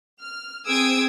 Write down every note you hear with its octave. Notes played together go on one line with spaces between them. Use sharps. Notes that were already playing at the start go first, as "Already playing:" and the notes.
F6
C4 G#4 D#6 E6 G#6 D7